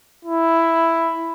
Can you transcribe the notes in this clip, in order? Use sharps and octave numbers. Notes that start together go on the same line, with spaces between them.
E4